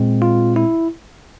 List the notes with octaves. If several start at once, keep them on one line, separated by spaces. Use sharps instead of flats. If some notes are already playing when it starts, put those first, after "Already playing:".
Already playing: A#2 G#3 C4
F4
E4